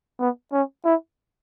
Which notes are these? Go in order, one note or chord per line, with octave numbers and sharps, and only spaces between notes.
B3
C#4
E4